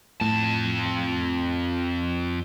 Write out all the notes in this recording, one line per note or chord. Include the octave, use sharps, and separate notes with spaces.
F2 A2 A5